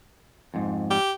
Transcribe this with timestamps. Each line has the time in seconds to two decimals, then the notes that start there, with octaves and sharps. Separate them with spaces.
0.54 F2 G#2
0.90 G4